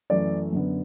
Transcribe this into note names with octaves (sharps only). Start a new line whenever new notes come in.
F#2 E3 A3 D5
F#2 D3 B3